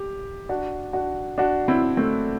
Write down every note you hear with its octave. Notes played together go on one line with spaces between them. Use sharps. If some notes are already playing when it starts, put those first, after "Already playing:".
Already playing: G4
D4 F#4
D4 F#4
D4 F#4
C4 E4
A3 C4